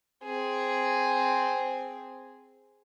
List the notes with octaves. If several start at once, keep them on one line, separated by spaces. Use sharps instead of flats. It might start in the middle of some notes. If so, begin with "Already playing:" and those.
C4 G#4